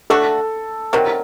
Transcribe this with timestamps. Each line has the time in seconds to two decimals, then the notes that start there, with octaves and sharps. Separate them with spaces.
0.10 A3 D4 F#4 A4
0.93 C3 D#3 F#3 A#4